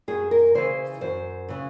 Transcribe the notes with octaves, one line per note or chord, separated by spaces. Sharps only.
F#2 G#4
A#4
C#3 E3 C5
F#2 C5
C#3 E3